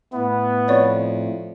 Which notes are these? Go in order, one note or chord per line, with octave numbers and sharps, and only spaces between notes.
A2 A3 B3
F2 C#5 D5 C#6